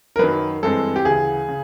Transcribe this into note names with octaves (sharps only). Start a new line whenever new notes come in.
A#4
F#2 D#3 F#3 B4
G2 E3 G#3 C4 A4
G4
D2 C#3 E3 G#4
C#3